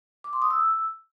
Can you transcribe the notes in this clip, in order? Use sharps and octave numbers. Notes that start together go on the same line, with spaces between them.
D6
C6
D#6
E6